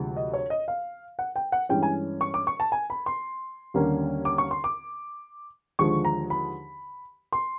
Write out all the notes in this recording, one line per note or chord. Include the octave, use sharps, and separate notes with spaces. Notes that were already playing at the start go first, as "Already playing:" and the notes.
Already playing: D2 C3 F3 G#3
D#5
C#5
D#5
F5
F#5
G5
F#5
G2 E3 G#3 C#4 G5
G#5
C#6
D6
C#6
A5
G#5
B5
C6
D#2 D3 G3 A#3 C#4
D6
C#6
C6
D6
D#2 D3 F3 G#3 C#6
A#5
B5
C6